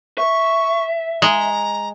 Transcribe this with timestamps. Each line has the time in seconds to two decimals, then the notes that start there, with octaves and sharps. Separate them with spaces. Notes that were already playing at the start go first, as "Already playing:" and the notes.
0.18 E5 C#6
1.22 G#3 A#5